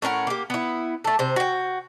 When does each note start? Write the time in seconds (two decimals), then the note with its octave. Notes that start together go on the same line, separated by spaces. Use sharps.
0.02 A2 C#4 A#4 F#5
0.27 A#3 G4
0.50 B3 E4
1.04 A3 A4
1.19 C3 C5
1.36 F#4 G5